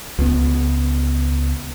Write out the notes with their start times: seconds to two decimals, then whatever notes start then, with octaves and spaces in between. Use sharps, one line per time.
0.19 C#2 B3